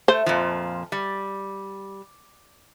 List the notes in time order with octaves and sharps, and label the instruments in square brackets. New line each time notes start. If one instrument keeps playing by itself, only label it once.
[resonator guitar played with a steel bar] A3 [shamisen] C5
[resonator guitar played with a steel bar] F2 A#2 F3
G3